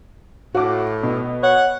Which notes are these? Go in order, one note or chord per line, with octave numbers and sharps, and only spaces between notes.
A2 F#4 D6
B2
C#5 F#5